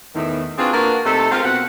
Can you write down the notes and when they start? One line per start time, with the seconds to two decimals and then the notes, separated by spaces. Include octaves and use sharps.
0.15 E2 A2 D#3
0.58 C4 D4 F4 F#4 G#4 B4
0.73 A#3 D4 F4 F#4 A#4 B4
1.05 C3 A3 D#4 A4
1.31 G#3 C4 F4 A#4 F5
1.43 B2 C4 B4 F#5